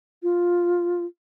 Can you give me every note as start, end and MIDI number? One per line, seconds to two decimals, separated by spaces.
0.23 1.04 65